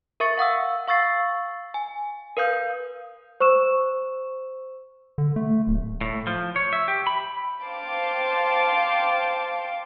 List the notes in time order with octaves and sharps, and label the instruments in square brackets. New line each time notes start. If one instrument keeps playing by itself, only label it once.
[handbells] A#4 E5 C#6 A6 C#7
F5 F#5 D#6 E6
F5 C#6 E6 A6 C7
G#5
A#4 B4 F5 D#6 G6
[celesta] C5 C#6 E6 E7
[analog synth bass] D3
A3
D1
[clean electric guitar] A2
F3
C#5
E5
G4
B5
[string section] C5 F5 G5 A5 C6 D6